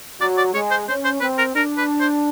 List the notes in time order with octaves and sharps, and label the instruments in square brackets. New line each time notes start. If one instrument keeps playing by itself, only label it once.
[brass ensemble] F#3 [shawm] D5
[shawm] D5
[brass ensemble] G#3 [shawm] C#5
[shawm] C5
[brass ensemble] C#4 [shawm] C5
[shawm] C5
[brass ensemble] C4 [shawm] B4
[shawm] A#4
[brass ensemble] D4 [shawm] A#4
[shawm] B4
C5